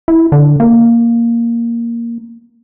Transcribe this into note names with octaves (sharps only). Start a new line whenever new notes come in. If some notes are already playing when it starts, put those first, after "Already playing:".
E4
D3
A#3